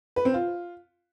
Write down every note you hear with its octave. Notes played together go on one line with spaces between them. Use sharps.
B4
C4
F4